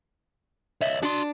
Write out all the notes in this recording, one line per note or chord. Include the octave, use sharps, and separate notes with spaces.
C#5 D#5 E5
D4 F#4 C6